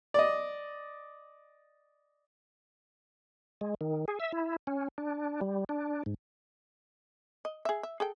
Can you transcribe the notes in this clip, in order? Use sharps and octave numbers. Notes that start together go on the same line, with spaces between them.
D5 D#5
G#3
D#3
G#4
E5
E4
C#4
D4
G3
D4
G#2
D#5
G#4 E5
E5
G#4 A4 G5